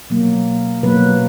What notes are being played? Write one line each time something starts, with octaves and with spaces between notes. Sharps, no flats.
B2 F#3 A#3
B2 F#3 A#3 B4